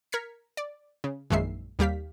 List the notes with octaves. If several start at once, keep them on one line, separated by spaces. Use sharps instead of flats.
A#4 F6 G#6 B6 C#7
D5
C#3
A#1 F#2 D#3 G#3 E5 C7
D#2 G3 G4 F5 B6